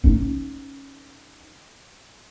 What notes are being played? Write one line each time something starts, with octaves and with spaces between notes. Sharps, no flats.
C#4 D#4